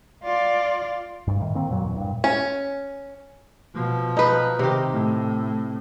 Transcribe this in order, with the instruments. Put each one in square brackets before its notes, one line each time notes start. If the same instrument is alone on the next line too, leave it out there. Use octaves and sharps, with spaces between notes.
[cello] F4 D5
[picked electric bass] G2
A2 D#3
D#3 A#3 C4
F#2 A#2 F#3
E2
G2 A#2
[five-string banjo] C#4
[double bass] B2 F3
[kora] D#4 B4
[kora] C3 G4 [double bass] D#3
[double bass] A2